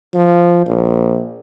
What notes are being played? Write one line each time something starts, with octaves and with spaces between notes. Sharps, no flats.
F3
A#1